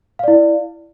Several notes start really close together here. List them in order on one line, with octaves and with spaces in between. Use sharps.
F5 D5 E4